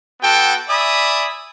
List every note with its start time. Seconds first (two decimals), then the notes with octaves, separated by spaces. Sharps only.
0.21 B3 F#4 A4 G5
0.69 D5 E5 G#5 B5 D#6